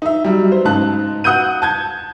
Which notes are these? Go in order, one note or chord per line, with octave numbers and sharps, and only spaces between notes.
D#4 E5
F#3 G3
C5
G#2 C#3 D#4 A5 F#6
F#5 D#6 F#6 G6 D#7
A5 G6 G#6